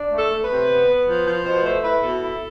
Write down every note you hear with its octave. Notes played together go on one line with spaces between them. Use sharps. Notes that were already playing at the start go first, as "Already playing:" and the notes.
Already playing: D4
A3
A4
A3
B4
C3
B3
B3
F3
F3
B2 C5
A3 C5
E4 B4
B2 A4
E4